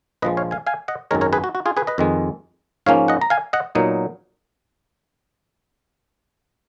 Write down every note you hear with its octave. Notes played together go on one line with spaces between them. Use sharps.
A#1 A#2 F3 G#3 B4 D#5
C#5 F5
F5 G#5
F5 G#5
D#5 F#5
G#1 F#2 D#3 G#3 A#4 C#5
A#4 C#5
G#4 B4
F#4
F#4
F4 G#4
G#4 B4
B4 D#5
F2 D#3 G#3
G#2 F3 A#3 C#4 C#5 F5
D#5 F#5
A#5
F5 G#5
D#5 F#5
A#2 F#3 B3 D#4